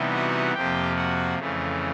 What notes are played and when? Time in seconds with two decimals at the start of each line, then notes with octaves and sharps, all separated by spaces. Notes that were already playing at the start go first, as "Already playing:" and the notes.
Already playing: C3 E3 G3 B3 D#4
0.12 F#4 F#5
0.54 F2 C3 F3 A#3 G4 G5
0.97 F#4 F#5
1.38 F2 C#3 E3 A3